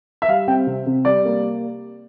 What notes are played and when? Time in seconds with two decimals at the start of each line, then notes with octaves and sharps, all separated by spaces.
0.22 E5
0.28 G3 F5
0.48 C4 G5
0.67 C3
0.87 C3
1.05 G3 D5
1.25 A#3